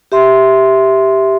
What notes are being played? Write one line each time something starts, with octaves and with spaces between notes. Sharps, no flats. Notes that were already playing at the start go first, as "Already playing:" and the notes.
G4 E5 C6